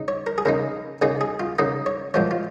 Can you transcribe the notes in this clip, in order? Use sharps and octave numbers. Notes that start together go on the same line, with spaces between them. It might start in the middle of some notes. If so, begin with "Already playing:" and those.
Already playing: C#3 D#4
C#5
A#4
G#4
C#3 A#3 D#4 A#4
C#3 A#3 D#4 G#4
G#4
F4
C#3 A#3 D#4 D#5
C#5
A#2 F3 G#3 F4 C#5
F4